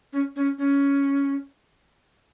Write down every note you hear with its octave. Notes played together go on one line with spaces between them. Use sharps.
C#4
C#4
C#4